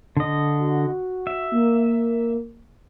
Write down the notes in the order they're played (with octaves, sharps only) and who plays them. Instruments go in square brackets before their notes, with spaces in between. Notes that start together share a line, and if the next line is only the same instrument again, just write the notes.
[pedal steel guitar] D3 D#5
[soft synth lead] F#4
[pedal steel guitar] E5
[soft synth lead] A#3